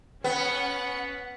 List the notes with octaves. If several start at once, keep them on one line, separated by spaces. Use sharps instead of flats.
B3 C#4 F#5 C#7